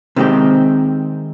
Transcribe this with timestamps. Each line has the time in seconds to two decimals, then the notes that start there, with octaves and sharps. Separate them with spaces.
0.16 C3 D#3 G#3 C4 G4